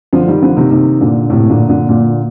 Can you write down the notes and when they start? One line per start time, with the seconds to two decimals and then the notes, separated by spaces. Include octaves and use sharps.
0.13 D3 F3
0.27 D#3 G3
0.42 D3 F3
0.56 C3 D#3
0.71 C3 D#3
1.01 A#2 D3
1.29 A2 C3
1.49 A#2 D3
1.69 A#2 D3
1.89 A#2 D3